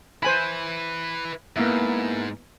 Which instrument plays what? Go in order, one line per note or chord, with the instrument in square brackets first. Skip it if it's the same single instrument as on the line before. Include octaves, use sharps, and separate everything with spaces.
[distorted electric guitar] E4 B4 [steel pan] C5 G#5 B5
[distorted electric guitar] G#2 [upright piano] A#3 B3 E4